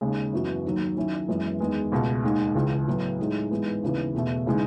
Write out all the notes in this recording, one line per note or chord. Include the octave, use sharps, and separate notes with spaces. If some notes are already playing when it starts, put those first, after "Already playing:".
D#2 C#3 G#3
F#2 E3 B3 F#4
D#2 D#3 F#3
D#3 F#3 C#4 E4
F#2 E3 G#3 B3
E2 D#3 G#3 B3
C#2 B2 A3
D#2 D#3 G#3
C#2 C#3 E3
A2 F#3 B3
A2 G#3 D#4 G#4
G#2 E3 G#3 B3
D#2 C#3 E3 B3
E2 B2 A3
C#3 E3 G#3 D#4